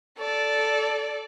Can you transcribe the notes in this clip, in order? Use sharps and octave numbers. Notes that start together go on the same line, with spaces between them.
A4 D5